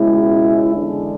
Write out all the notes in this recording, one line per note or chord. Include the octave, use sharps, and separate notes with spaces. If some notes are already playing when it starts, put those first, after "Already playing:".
Already playing: C#2 B2 G#3 C#4 E4
E2 D3 G#3 D4